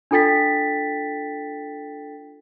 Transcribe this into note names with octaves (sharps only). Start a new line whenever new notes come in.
D4 F4 A4 G5 A6 B6